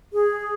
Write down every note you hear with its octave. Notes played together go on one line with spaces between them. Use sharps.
G#4